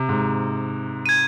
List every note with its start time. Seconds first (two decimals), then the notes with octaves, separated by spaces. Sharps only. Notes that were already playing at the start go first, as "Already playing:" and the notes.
Already playing: C3
0.09 G#2
1.06 G#6 D#7